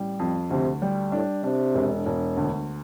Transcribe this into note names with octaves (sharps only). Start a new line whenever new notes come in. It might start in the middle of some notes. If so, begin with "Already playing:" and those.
Already playing: A1 G3
F2
D2 C3
G3
A2 D4
C3 D4
E1
E1
D2